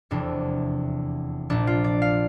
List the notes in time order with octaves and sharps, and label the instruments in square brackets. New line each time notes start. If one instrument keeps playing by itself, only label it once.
[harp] F1 E2 C3 E3 D4
A#1 A#2 D4
F4
D5
F5